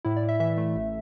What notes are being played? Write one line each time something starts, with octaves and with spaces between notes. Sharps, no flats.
A2 E4
D5
A2
E5
E3 E5
A3
A1